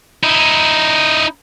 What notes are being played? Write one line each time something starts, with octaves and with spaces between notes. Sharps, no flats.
D#4 E4